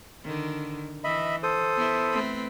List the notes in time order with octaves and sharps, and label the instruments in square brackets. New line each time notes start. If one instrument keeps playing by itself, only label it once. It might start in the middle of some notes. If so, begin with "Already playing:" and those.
[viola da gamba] D3 D#3
[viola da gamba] E3 [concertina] D#5 E5 B5
[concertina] A4 C5 D#6
[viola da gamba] B3 E4
A3 C4 B4